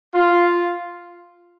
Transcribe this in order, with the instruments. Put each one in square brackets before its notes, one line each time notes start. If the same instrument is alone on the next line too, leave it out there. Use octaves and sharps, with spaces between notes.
[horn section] F4